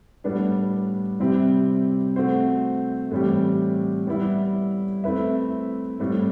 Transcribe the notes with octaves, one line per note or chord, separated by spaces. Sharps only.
A2 G3 B3 D4
C3 G3 C4 E4 G4
A3 C4 F#4 C5
A2 E3 G3 C4 G4
G3 B3 E4
A3 C4 E4 B4 E5
A2 G3 C4